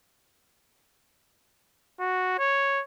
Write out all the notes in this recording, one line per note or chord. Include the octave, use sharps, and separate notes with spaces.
F#4
C#5